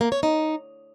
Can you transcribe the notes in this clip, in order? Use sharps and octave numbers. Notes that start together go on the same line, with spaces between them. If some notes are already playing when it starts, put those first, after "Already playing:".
A#3
C#5
D#4